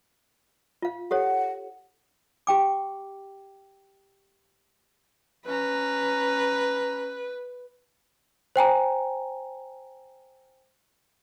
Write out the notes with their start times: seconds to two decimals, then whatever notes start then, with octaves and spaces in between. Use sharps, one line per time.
0.82 F4 F5
1.11 G4 A4 C#5 F#5
2.47 G4 G5 D6
5.46 C#4 B4 A#5
8.56 C5 G5 G#5 A#5